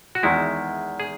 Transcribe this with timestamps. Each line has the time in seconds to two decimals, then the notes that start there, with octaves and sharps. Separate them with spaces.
0.15 F#4
0.23 E2 D#3 G#3 E4
1.00 G#4